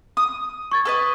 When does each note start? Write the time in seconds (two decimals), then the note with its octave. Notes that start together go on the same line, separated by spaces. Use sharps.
0.17 D#6
0.71 C#6 G#6 A6
0.85 A4 B4 D#5